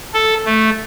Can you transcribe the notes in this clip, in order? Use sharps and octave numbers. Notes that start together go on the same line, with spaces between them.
A4
A3